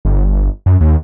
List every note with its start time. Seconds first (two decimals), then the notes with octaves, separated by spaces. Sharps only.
0.05 G1
0.66 F#2
0.81 D#2